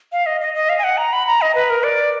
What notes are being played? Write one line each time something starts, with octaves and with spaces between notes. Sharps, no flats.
F5
D#5
D#5
D#5
F5
G#5
F#5
A#5
B5
A#5
D#5
B4
A#4
D5